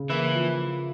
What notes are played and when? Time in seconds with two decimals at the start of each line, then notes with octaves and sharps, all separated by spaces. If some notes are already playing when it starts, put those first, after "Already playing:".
Already playing: C#3
0.09 E3 A#3 E4
0.34 F3